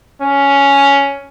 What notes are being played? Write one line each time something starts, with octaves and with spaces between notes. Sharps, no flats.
C#4